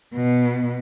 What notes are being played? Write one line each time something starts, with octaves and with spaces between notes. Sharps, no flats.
B2